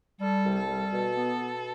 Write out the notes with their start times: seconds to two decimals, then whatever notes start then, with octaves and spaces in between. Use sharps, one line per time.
0.21 G3 A4
0.45 C2
0.56 A4
0.68 G3
0.92 B2
1.16 B3
1.39 B2